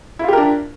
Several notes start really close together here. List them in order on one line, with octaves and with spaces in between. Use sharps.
E4 F4 G4 A#4 D4